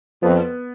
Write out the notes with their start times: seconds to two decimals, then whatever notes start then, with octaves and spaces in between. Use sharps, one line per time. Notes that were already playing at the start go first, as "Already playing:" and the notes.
0.22 F2 B3